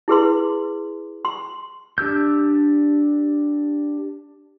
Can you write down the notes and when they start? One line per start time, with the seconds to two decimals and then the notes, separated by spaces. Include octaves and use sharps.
0.08 E4 G#4 B4 C6
1.25 C6
1.98 D4 G4 E6 G6